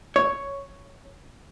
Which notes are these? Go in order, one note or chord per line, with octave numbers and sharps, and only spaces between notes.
C#5